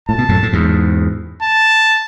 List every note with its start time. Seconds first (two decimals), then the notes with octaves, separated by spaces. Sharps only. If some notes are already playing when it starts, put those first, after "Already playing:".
0.08 A2 A5
0.18 B2
0.29 F#2 A2
0.43 A2
0.53 E2 G#2
1.42 A5